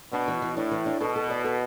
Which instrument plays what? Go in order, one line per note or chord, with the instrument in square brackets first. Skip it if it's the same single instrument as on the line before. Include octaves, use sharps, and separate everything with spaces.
[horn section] B2 [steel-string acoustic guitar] D4
[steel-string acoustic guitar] E3
E3
[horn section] A2 [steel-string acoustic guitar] D4
[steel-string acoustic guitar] E3
D4
[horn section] B2 [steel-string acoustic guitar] A4
[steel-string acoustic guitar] A4
D5
A4